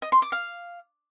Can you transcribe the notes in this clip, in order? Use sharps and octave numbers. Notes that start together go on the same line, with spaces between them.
D#5
C6
D6
F5